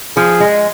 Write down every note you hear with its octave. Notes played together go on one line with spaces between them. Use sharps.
F3 G#4
G#3